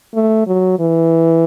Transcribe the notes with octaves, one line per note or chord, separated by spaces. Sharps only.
A3
F#3
E3